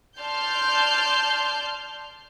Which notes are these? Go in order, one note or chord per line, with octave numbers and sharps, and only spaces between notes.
D5 A5 C6 F6 G6